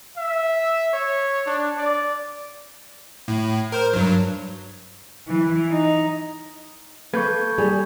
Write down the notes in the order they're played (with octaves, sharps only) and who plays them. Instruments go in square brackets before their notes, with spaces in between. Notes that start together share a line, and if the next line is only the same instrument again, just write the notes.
[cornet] E5
C#5
D4
D5
[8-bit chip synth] A2
A#4 C5
G2 F#3
[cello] E3
D#4
[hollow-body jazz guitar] A#3 A4 B4 [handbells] C#6 G6 G#6
[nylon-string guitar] G3 [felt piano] G#4